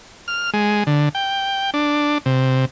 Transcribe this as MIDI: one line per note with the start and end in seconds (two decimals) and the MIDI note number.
0.28 0.50 89
0.54 0.84 56
0.87 1.09 50
1.15 1.70 79
1.74 2.18 62
2.26 2.65 48